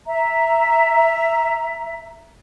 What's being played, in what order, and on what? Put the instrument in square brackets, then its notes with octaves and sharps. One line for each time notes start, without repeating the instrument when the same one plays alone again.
[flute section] E5 A#5